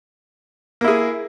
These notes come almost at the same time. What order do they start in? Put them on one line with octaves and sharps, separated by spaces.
A#3 E4 G#4